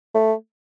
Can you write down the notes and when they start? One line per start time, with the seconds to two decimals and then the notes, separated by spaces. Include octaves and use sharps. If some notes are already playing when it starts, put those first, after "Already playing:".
0.15 A3